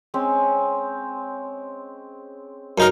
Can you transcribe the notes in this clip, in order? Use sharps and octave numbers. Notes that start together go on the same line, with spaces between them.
G#3 C4 C#4
F#2 D#4 A#4